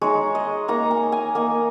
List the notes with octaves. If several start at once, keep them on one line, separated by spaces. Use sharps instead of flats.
G#3 D#4 C#5
D#5
A#3 D#4 A#5
G#5
G#5
A#3 D#4 G#5